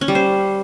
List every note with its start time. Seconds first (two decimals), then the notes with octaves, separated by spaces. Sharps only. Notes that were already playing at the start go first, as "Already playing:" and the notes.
0.01 C#4
0.08 G3
0.15 C5